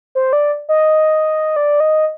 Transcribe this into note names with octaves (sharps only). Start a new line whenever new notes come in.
C5
D5
D#5
D5
D#5